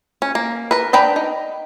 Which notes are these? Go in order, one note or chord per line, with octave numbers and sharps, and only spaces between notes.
C#4
A#3
A#4 B4
D4 B4 G5 A#5 B5
D#4